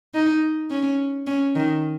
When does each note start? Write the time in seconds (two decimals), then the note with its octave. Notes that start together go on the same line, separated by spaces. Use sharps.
0.14 D#4
0.70 C#4
1.27 C#4
1.55 D#3